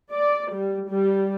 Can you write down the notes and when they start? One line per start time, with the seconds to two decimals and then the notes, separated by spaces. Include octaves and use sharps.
0.10 D5
0.51 G3
0.87 G3